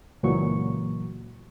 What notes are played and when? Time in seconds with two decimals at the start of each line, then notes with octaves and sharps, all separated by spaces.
0.23 C#2 A#2 E3 F#3 A#3 C#6